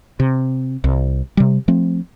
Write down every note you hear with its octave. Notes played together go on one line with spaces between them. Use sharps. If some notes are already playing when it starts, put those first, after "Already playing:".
C3
C2
C3 G3
F3 A3 C4